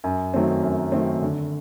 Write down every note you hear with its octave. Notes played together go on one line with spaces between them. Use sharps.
F#2
D#3 F#3 A3 C4
F#2
D#3 F#3 A3 C4
D3